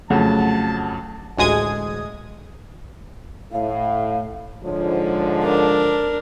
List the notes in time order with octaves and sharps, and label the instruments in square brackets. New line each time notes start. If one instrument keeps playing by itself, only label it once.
[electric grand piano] F2 C#3 F#3 [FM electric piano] A3 F#5 [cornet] A5
[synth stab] A1 D2 G#3 D#6 G#6
[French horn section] A2 [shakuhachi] F5
[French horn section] G#2 D3 F3 [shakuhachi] C#5
[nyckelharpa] D4 A#4